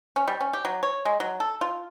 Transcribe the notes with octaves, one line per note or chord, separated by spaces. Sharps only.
C#4
G3
C#4
G4
F#3
C#5
G#3
F#3
A4
F4